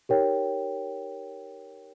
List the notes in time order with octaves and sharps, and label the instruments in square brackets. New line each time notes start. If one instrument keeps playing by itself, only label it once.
[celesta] D#4 G4 A#4 C#5 G5